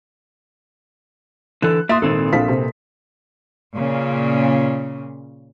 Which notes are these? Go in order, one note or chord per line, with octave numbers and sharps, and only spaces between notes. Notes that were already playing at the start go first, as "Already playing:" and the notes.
D3 E3 A4 F#6
A#3 E5 C6 D#6 A6
G#1 A#2 C4 A4
A#1 F5 B6
C3
A#2 C#3